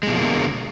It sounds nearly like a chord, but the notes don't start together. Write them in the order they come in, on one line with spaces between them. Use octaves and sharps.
G#3 B2 F3 A#3 D3